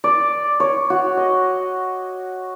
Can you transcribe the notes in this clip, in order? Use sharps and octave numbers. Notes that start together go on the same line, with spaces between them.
D5
C#5
F#4
D#5